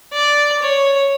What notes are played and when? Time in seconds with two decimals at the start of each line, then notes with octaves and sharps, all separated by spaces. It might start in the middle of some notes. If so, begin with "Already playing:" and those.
0.13 D5
0.62 C#5